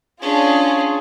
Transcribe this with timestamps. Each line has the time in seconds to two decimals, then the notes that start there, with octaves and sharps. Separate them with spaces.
0.22 C#4 D4 F4 G#4